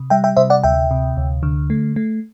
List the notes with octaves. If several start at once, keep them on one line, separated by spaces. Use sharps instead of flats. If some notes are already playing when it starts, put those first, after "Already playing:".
Already playing: C3
G3 E5 G5
E5 G5
C3 C5 E5
D5 F#5
D2 E5 G5
C3
D2
D3
A3
A3